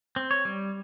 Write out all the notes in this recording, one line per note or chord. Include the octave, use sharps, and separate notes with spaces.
C4
C#5
G3